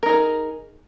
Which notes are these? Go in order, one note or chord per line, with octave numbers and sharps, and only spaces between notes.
D#4 G#4 A#4